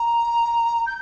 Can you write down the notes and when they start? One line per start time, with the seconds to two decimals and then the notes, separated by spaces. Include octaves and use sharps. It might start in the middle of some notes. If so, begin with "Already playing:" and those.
Already playing: A#5
0.86 G6